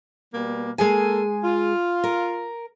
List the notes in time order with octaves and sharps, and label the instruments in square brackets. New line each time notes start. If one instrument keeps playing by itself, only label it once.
[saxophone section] B2 G3 A#3
[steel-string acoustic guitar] G#3 G#4 G#5 [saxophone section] A#3 A4
[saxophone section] F4
[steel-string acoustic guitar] A#4